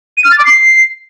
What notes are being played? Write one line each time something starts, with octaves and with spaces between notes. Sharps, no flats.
D#7
F6
A6
D6
C7